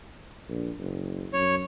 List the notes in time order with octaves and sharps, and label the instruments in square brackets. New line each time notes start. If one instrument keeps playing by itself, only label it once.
[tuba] A#1
F#1
[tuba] F#2 [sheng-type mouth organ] C#5